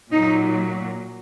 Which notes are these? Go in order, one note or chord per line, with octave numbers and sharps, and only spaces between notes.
A#2 F#3 D#4